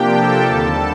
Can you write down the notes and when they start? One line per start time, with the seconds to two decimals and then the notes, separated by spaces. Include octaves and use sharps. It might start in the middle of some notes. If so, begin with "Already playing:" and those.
Already playing: C3 F3 A#3 D4 G4 G5
0.15 A4 A5
0.46 D#2 D3 G3